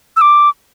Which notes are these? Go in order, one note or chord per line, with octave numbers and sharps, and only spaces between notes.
E6
D6